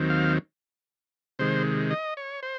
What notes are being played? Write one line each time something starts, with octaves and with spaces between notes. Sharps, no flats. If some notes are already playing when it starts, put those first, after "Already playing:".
Already playing: D#2 D#3 F#3 C4
F5
C3 D#3 G#3 C5
D#5
C#5
C5